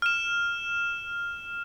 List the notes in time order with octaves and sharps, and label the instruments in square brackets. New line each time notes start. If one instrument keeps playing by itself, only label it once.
[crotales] F6 E7